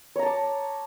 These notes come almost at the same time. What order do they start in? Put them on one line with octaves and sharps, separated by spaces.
C#5 A#5 A5 D6